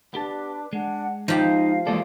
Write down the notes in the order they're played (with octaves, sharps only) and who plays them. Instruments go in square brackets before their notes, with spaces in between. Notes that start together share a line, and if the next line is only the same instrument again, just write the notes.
[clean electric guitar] B3 G4 A5 [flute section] D4 B4 D6
[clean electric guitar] G#3 [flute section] D4 F#5
[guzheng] F3 G4 [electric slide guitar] D#4 F4 [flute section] F5
[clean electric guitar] E2 E3 D5 [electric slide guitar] G#3 A#3 A4